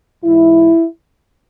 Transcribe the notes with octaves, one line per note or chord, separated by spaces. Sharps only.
G#2 E3 E4